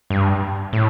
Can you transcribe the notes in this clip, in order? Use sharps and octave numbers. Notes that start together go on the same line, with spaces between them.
G2
A2